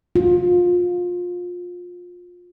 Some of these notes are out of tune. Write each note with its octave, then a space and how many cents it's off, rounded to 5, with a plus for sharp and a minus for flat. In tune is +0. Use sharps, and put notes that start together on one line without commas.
F4 +25